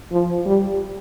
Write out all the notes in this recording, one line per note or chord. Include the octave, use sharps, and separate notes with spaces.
F3
G3